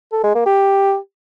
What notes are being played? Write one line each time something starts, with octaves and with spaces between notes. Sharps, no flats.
A4
G#3
A#3
G4